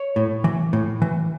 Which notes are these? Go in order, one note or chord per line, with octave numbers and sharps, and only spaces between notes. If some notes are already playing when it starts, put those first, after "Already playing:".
Already playing: C#5
A2
E3
A2
E3